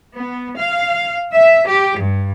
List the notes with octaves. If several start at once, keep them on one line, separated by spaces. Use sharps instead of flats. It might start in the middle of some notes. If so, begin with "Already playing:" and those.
B3
F5
E5
G4
G2